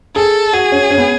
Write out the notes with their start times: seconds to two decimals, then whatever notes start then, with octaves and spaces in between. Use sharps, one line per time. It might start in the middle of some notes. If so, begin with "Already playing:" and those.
0.16 G#4 A4
0.53 F#4 G#4
0.72 C#4
0.90 C#4
0.98 B3